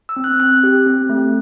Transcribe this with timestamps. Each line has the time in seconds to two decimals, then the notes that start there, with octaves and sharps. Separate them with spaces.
0.09 E6
0.16 C4
0.24 F#6
0.40 C4 F#6
0.64 G4
0.86 C4
1.09 A3